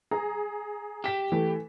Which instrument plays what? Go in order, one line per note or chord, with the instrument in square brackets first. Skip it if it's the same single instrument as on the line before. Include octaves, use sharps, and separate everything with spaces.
[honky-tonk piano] G#4 A#5
[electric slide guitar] G4 [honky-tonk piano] B6 E7
[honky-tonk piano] E3 A3